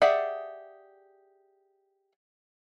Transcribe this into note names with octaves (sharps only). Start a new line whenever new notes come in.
G4 G#4 D5 E5 F#5